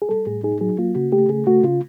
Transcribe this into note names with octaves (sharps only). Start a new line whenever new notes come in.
G#4
G3 A4
A2 G#4
D#4 G#4
F#3 G#4
A#3 F4
C#3 F#4
A3 G4
C#3 G#4
A3 F#4
C#3 F4